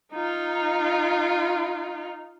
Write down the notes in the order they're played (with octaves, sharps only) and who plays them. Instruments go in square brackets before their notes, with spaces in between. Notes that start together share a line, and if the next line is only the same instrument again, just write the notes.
[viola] D#4 F4